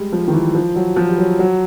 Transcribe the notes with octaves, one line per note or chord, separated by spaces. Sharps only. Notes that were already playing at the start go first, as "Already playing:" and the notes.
Already playing: G3 G#3
F3
D#3
E3
F3
F#3
F3
G3
F#3
F#3